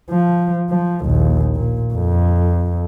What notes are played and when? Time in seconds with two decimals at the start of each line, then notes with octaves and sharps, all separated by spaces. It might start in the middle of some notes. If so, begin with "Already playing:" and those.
0.10 F3
0.70 F3
1.05 A#1 D#2
1.56 A#2
1.94 F2